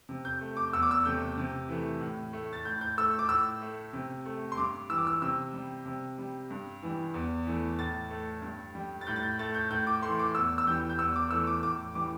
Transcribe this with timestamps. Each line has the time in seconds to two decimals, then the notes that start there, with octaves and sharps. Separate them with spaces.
0.09 C3
0.25 G6
0.41 A3
0.57 D6
0.73 E2 E6
0.82 D6
0.91 E6
1.05 C3 A3 G6
1.38 C3
1.69 E3 A3
2.01 A2
2.33 A3
2.53 A6
2.65 A2 G6
2.81 G6
2.97 A3 E6
3.19 D6
3.29 A2 E6
3.62 A3
3.93 C3
4.26 A3
4.52 C6
4.57 G2 D6
4.89 E3 G3 E6
4.98 D6
5.07 E6
5.22 C3 E6
5.53 G3
5.86 C3
6.18 G3
6.51 G2
6.83 E3 G3
7.14 E2
7.47 E3 A3
7.78 A2 A6
8.10 A3
8.42 G2
8.75 G3
9.01 A6
9.07 A2 G6
9.16 A6
9.23 G6
9.39 A3 A6
9.54 G6
9.71 A2 G6
9.87 D6
10.02 E3 A3 C6
10.19 D6
10.35 E2 E6
10.58 E6
10.67 E3 G3 G6
10.90 G6
10.99 E2 E6
11.16 D6
11.31 E3 A3 E6
11.47 D6
11.63 A2 D6
11.95 E3 G3 D6